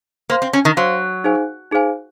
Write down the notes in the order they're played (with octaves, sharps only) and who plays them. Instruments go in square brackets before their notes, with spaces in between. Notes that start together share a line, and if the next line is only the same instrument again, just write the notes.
[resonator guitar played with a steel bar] A#3 [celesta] C5 F5 C6
[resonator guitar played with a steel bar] C4
C#4
D#3
[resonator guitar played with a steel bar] F#3 [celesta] C5 F5 C6
[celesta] D#4 G#4 C5 F5 G#5
D#4 G#4 C5 F5 G#5